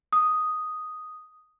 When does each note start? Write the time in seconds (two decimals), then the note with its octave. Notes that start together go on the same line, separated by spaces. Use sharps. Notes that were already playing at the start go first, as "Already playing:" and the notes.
0.13 D#6